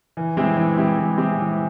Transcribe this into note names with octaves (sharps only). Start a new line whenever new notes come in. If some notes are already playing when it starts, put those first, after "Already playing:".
E3
G#3 C4 E4 G4
E3
G#3 C4 E4 G4
E3
G#3 C4 E4 G4
E3